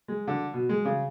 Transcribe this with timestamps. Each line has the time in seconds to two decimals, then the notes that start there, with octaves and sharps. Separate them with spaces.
0.08 G#3
0.28 D3
0.54 B2
0.69 G#3
0.85 C#3